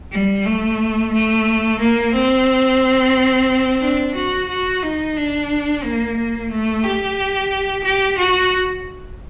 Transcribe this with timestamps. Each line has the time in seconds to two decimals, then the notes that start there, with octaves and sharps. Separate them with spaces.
0.11 G3
0.46 A3
1.13 A3
1.80 A#3
2.14 C4
3.81 D4
4.16 F#4
4.49 F#4
4.83 D#4
5.17 D4
5.84 A#3
6.17 A#3
6.51 A3
6.84 G4
7.85 G4
8.18 F#4